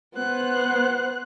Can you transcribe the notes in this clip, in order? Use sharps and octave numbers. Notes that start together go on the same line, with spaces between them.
B3 C5 F#6